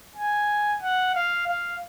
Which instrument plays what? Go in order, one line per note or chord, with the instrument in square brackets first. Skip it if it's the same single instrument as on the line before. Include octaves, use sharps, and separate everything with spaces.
[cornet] G#5
F#5
F5
F5